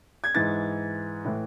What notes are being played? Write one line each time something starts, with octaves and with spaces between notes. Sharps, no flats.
G#6
G#2 E3 A6
A2 E3